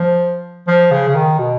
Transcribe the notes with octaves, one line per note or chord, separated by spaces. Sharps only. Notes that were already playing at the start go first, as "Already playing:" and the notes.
Already playing: F3
F3
C#3
C#3
D#3
B2